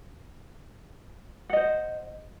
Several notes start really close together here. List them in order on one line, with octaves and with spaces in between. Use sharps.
F#5 D#5 C5